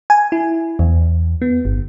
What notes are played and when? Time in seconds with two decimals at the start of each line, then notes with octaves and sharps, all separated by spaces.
0.10 G#5
0.32 E4
0.79 E2
1.42 B3
1.65 G1